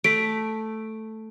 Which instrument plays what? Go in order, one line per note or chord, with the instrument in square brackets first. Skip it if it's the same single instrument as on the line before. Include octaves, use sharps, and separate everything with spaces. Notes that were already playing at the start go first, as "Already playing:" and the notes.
[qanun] A3 [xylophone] B6 D7